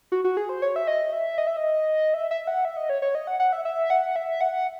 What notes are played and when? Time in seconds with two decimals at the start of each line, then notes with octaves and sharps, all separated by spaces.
0.12 F#4
0.24 F#4
0.37 G#4
0.49 C5
0.62 C#5
0.76 E5
0.88 D#5
1.13 E5
1.38 D#5
1.47 E5
1.57 D#5
2.14 E5
2.31 E5
2.47 F#5
2.65 E5
2.77 D#5
2.90 C#5
3.02 C#5
3.15 D#5
3.27 F#5
3.40 F#5
3.53 E5
3.65 E5
3.90 F#5
4.16 E5
4.41 F#5